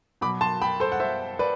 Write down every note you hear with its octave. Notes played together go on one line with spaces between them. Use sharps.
B2 F#3 B5 D6
A5 C6
G5 B5
A4 C5
F#5
C5 E5
B4 D5